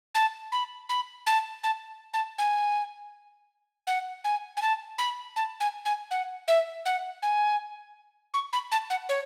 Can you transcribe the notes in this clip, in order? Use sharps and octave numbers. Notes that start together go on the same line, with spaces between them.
A5
B5
B5
A5
A5
A5
G#5
F#5
G#5
G#5
A5
B5
A5
G#5
G#5
F#5
E5
F#5
G#5
C#6
B5
A5
F#5
C#5